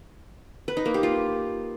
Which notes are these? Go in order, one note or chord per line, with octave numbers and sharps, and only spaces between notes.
B4
D#4
A#3
G4
F4